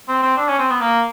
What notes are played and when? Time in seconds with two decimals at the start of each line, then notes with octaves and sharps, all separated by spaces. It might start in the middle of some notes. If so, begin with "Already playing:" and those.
0.08 C4
0.23 C4
0.37 D4
0.48 C#4
0.59 C4
0.70 B3
0.81 A#3